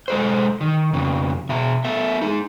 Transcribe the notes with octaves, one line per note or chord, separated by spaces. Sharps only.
G#3 A4 C5
D#3
F2 C#3
B2 E5
B3 A4 E5
D#4 G#4